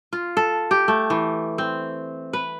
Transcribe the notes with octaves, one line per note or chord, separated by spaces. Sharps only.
F4
A4
G4
A3
E3
C4
B4